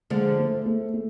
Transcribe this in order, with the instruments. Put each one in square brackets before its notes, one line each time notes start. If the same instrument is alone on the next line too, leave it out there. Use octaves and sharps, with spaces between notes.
[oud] D3 F3 [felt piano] G#3
[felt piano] A3
A3
A3